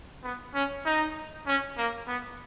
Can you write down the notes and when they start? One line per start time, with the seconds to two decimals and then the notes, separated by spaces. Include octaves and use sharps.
0.24 B3
0.54 C#4
0.86 D#4
1.47 C#4
1.77 A#3
2.08 B3